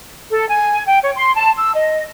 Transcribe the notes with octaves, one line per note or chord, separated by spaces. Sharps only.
A4
G#5
G5
C#5
C6
A5
E6
D#5